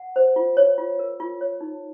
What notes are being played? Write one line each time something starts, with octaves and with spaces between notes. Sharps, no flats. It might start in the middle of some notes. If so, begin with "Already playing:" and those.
Already playing: F#5
C5
F4
C#5
F4
A#4
F4
C#5
D#4